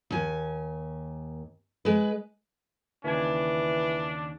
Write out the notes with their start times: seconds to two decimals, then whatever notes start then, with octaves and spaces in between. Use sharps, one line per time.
0.10 D#2 G#5
1.85 G#3 B4
3.04 D#2 C#3 E3 D4 G#5